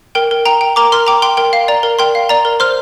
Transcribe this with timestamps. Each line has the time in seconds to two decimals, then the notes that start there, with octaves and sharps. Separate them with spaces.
0.15 A#4 G5
0.31 A#4
0.45 G5 A#5
0.61 G5
0.76 A#4 A#5 D6
0.92 A#4 C6 F6
1.07 G5 A#5 D6
1.22 G5 C6
1.37 A#4 G5
1.53 F5
1.68 D5 A#5
1.83 A#4
1.99 A#4 G5 C6
2.15 F5
2.29 D5 A#5
2.45 A#4
2.60 C5 C6 F6